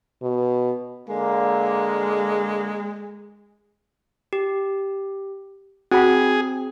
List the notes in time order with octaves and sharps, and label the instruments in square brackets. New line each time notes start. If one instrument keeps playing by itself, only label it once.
[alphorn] B2
[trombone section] D3 A#3 [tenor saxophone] G#3
[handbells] G4
[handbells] C4 [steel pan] F#4 B5 [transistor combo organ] G#4